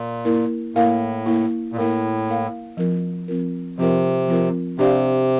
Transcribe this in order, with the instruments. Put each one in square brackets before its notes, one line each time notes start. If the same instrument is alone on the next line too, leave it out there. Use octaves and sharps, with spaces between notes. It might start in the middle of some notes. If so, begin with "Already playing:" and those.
Already playing: [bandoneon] A#2
[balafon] A#3 E4 A#4
[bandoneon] A2 [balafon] A#3 E4 A#4 F5
[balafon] A#3 E4 A#4 F5
[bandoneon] A#2
[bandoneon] A2 [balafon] A#3 E4 A#4 F5
[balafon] A#3 E4 A#4 F5
F3 C4 F4 A#4
F3 C4 F4 A#4
[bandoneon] C3 [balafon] F3 C4 F4 A#4
[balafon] F3 C4 F4 A#4
[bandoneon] C3 [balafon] D4 G4 D5 F5